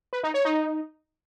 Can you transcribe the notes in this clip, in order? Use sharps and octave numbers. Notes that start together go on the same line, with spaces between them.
B4
D#4
C#5
D#4